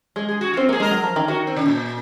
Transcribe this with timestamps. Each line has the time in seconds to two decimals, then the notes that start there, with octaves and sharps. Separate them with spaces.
0.16 G#3 G#4
0.29 G#4
0.41 F#4
0.54 F4
0.57 C4
0.69 A#3 G#4
0.80 G#3 A#4
0.91 F#3
1.04 F3
1.16 D#3
1.28 D#3 F#4
1.47 C4
1.56 C#3
1.66 A#2